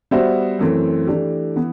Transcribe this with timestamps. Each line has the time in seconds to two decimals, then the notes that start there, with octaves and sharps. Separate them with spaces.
0.11 G3 B3 F#4 C5 E5
0.59 F#2 E3 A3 C4
1.07 E3 A3 D4 G4
1.56 E3 B3